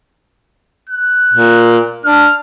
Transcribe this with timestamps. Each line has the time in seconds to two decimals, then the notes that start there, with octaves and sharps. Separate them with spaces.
0.89 F#6
1.34 A#2
2.05 D4 F6